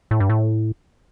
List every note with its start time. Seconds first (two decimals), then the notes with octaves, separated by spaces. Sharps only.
0.11 A2
0.20 G2
0.30 A2